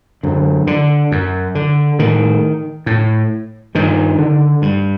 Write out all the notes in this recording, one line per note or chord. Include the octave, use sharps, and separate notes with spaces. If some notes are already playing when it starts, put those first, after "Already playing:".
F#2 D3
D3
F#2
D3
A2 D#3
A2
G2 D#3
D3
G2